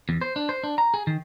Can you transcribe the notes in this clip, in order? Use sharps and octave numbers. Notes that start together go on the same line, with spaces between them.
E2
C5
D4
C5
D4
A#5
G#4
D#3